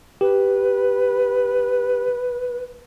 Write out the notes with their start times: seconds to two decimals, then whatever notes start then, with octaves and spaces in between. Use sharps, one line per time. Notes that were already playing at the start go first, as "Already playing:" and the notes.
0.21 G4 B4